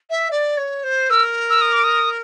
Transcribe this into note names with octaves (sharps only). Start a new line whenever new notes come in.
E5
D5
C#5
C5
A#4 E6
E6
D#6
D6
D#6